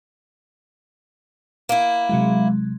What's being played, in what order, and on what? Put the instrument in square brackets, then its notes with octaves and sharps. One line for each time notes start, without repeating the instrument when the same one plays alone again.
[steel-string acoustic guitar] A#3 E4
[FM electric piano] C3 F#3 G#3